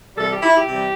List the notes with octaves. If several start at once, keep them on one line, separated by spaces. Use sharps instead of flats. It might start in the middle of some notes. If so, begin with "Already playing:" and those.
C3 E3 G3 A4
G4
E4
G4
C3 E3 G3